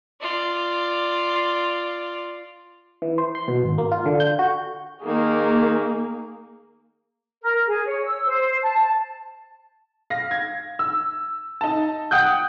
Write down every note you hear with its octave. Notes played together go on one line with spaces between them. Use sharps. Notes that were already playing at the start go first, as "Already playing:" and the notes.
F4 D5
E3
C5
C6
B2
G#1
A#3
F4
D3
G6
F#4
D#3 A#3 G#4
A#4
G#4
C#5
E6
C5
A5
F5 A#6
G#6
E6
D#4 A5
F#5 G5 D#6 F#6 G6